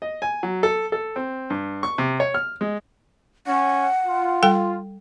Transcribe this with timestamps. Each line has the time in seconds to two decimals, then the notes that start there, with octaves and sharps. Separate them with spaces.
0.02 D#5
0.22 G#5
0.43 F#3
0.63 A4
0.92 A4
1.16 C4
1.50 G2
1.83 C#6
1.98 C3
2.20 C#5
2.34 F6
2.61 G#3
3.47 C#4 F#5
4.06 F4
4.43 G3 A4 G5